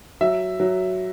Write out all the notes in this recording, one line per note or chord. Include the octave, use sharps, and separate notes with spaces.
F#3 E5
F#3